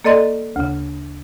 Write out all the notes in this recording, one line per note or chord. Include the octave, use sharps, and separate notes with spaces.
A#3 A4 D5 D#5 C6 A6
D2 C#3